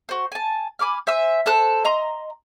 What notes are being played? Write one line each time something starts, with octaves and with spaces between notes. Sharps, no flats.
F#4 C5
G#5 A5
G#5 B5 D6 F6
C5 E5 G#5 E6
A4 C5 A5 F#6
D#5 A#5 C6